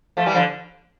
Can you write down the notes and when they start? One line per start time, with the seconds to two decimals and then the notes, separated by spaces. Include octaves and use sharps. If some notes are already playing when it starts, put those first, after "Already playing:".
0.17 F3 A3
0.26 E3 G3
0.35 D3 F3